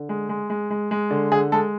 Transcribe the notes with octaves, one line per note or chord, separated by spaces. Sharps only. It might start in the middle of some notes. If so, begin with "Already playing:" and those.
Already playing: D3
G#3
G#3
G#3
G#3
G#3
D3
D3 G#4
G#3 A4